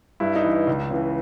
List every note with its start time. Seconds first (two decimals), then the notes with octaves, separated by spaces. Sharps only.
0.20 G2 E4
0.36 D#4
0.44 E3
0.67 C#2
0.90 C#3 E3